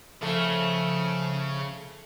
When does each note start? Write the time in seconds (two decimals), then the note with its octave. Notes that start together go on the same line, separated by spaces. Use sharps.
0.22 C#3 F3 A3